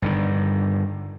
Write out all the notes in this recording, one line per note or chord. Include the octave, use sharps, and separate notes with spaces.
G2 D3 D#3